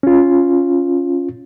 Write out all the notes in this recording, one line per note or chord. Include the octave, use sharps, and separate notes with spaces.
C#4 F4